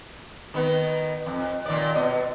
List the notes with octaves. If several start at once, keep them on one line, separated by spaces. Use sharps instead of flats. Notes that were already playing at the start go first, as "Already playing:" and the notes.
D#3 B3
F2
A#2 D#3 D5
B2 D#5